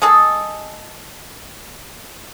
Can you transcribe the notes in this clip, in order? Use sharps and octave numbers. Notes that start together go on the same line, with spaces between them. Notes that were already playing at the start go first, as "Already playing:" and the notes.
G#3 D#4 G#4 A4